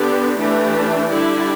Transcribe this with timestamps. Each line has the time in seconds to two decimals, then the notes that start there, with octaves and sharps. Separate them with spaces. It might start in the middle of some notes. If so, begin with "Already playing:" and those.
Already playing: D3 B3 D4 G4 D5
0.37 E3 A3 D4 G4
1.09 D3 G3 E4 G4 D5